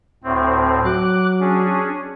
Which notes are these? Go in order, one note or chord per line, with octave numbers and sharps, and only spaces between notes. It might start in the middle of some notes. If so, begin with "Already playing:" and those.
D2 A2 C4
F#3 D6 F#6
C#4 D4 G#4